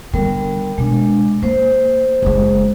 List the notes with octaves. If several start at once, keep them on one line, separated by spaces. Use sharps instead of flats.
D3 G3 B3 A#4
B2 G#3 D4
A#3 C5
F#1 G#3